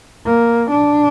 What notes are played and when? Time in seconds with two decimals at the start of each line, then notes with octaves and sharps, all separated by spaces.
0.25 A#3
0.71 D4